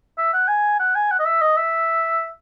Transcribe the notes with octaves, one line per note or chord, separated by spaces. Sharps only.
E5
F#5
G#5
F#5
G#5
F#5
D#5
E5
D#5
E5